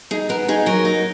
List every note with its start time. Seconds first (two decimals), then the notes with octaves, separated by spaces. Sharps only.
0.11 D#4 G#4
0.29 B3 A#4
0.48 D#4 G#4
0.66 F#3 A#4
0.85 D#4